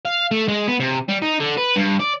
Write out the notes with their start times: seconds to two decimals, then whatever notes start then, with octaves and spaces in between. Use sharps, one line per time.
0.05 F5
0.31 A3
0.48 G#3
0.68 B3
0.80 C3
1.08 G3
1.22 D#4
1.40 D3
1.57 B4
1.76 G2
1.99 D5